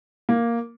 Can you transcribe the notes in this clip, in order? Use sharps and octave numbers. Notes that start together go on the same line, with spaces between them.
A#3